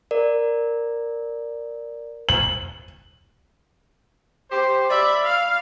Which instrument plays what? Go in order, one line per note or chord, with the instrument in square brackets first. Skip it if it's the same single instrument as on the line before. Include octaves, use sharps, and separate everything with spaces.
[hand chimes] A#4 D5
[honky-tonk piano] F#7
[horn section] G4 C5
[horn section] D5 [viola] E5 B5
[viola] F5